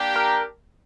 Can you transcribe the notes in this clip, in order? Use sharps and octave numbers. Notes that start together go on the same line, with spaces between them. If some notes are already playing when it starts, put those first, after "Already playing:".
Already playing: A#3 D4 G4
A#4